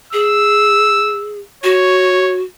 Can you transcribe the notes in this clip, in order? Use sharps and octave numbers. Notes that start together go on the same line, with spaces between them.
G#4 E6
F#4 C#5